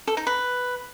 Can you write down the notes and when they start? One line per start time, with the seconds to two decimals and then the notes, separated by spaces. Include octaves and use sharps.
0.07 A4
0.17 D#4
0.27 B4